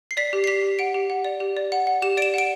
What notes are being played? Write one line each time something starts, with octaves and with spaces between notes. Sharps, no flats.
C7
D5 B6
G4
C7
G4 B6
G4
F#5 D7
G4
F#5
D5
G4
D5
F#5
F#5
G4 E7
D5 D7 E7
F#5 D7